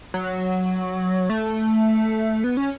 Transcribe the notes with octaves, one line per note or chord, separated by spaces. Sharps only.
F#3
A3
B3
C#4